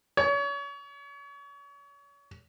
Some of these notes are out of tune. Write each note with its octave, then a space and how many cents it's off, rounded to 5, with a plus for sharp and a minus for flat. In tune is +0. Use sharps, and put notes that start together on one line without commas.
C#5 +35